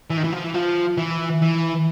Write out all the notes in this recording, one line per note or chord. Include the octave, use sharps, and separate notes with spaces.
E3
D#3
E3
F3
E3
F3
E3
E3